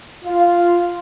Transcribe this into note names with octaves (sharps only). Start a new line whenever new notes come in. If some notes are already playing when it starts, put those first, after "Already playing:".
F4 F5